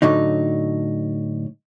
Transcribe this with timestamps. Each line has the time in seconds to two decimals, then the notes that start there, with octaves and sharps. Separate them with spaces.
0.02 A2 D3 F#3 D#4